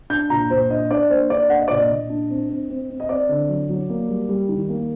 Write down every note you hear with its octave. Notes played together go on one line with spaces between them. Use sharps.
D4 G6
A#2 A#5
A#2 C5
D4 D#5
D4 D5
A#3 C5
D4 D5
D4 F#5
D#5
A#2 D5
D#5
A#2
D4
C4
C4
C4
C4
D#5
C4 D5
D3
F#3
F#3
A#3
G3
G3
D#3
A#3